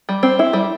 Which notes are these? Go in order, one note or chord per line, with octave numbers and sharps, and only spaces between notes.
G3
C4
E4
G3